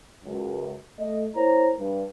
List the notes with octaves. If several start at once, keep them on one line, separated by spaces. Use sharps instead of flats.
C#2 F#2
A3 D#5
A#3 E4 C5 C#5 A#5
G2